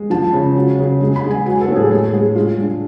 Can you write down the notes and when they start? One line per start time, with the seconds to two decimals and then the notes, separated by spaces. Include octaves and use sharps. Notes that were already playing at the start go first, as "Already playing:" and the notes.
Already playing: G#3
0.10 F3 A5
0.33 C#3
0.56 F#3
0.78 C#3
1.01 G#3
1.16 B5
1.24 G#3
1.31 G#5
1.46 F#3 G#5
1.61 A4
1.68 A2
1.76 G#4
1.91 G#3 G#4
2.13 G#3 G#4
2.35 G#3 F4
2.58 G#3 D4